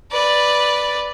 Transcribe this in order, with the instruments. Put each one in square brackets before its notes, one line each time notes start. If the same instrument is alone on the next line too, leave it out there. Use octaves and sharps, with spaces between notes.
[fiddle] B4 D5